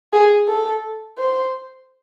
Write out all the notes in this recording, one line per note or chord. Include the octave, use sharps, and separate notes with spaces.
G#4
A4
C5